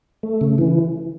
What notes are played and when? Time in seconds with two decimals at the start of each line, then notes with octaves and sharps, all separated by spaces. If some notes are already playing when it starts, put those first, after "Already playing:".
0.23 A3
0.41 C#3
0.58 E3